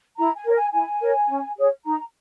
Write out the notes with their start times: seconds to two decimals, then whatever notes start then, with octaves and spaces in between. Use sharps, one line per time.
0.17 E4 A#5
0.36 G#5
0.45 A#4 C#5
0.55 G#5
0.73 E4 G#5
1.00 A#4 C#5
1.28 C#4
1.56 G#4 C#5
1.84 D#4 A#5